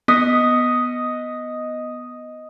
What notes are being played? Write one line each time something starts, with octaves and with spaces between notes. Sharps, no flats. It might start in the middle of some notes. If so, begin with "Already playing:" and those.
B3 D#5